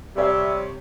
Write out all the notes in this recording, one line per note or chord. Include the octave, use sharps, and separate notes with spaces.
C3 G3 G4 C#5 E5